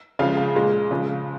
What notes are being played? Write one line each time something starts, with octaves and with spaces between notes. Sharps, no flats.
C#3 F3 G#3 F5
F5
A#2 G#3
C#3 F3 G#3